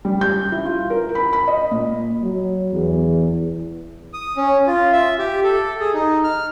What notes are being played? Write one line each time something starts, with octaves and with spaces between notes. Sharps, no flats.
G3
G6
E4
F4
A#4
B5
B5
D#5
A#2
F#3
E2
D#6
C#4
F4
E5
G4
A4
G#4
D#4
F6